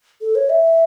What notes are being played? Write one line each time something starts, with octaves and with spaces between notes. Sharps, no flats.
A4
C#5
E5